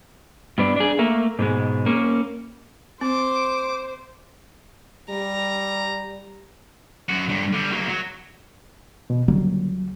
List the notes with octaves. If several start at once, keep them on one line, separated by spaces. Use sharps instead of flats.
G2 B3 D4
D4 G#4
A3 A#3
G#2 B2 G#3
A#3 C#4
C4 C5 D6
G3 A#5
F#2 F#4
G2 D3
D3 G3
F#3 A#3
F#3
B2
C#2 D3 F#3 G3 A#3